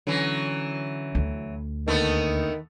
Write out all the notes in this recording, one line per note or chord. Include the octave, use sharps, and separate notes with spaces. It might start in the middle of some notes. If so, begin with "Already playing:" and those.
D3 E3 F#3 C#4
D2
D#2 D3 D#3 A3 B3 D4